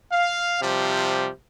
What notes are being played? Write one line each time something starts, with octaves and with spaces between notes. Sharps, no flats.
F5
C3 F3 G3